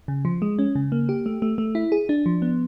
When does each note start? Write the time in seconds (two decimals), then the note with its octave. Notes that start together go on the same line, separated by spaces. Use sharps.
0.08 C#3
0.25 F3
0.42 G#3
0.59 C#4
0.75 C#3
0.92 A#3
1.09 G4
1.26 A3
1.42 A3
1.58 A3
1.75 E4
1.92 G#4
2.09 D4
2.26 F3
2.42 B3